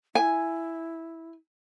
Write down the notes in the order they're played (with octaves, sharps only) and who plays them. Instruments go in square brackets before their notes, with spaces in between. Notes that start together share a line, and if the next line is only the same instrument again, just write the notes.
[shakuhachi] E4 [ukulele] G#5